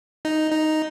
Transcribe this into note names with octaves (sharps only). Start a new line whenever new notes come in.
D#4
D#4